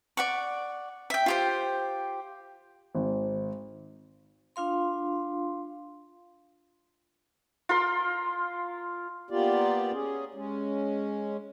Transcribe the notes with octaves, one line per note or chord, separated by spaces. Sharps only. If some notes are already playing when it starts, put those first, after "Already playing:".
D5 F#5 C#6
E5 G5
F4 G4 C5
G#1
D4 F4 F5 C6
F4 A#4 C6
A#3 B3 F4 G4 D5
C#4 G#4
G#3 C#4